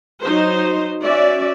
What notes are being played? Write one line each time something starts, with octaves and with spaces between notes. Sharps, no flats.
F#3 D#4 C5
C#4 F#4 D5 E5